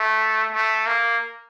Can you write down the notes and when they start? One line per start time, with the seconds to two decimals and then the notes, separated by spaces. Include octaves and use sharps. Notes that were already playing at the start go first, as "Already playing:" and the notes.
Already playing: A3
0.53 A3
0.87 A#3